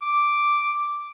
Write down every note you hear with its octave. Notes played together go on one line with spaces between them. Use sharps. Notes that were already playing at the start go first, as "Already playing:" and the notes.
D6